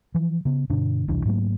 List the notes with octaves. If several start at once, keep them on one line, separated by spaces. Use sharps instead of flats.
E3 F3
C#3 B3
G2 B2 D3 D4
E1 C2 E3 D4
G#2 F#3 A3 A#3